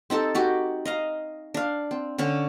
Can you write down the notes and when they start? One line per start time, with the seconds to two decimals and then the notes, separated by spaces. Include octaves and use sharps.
0.10 C4 D#4 G4 A4
0.35 D#4 F#4 G4
0.85 D#5 F5 A#5
1.54 D4 F5
1.91 C4
2.18 D3 C#4 C#5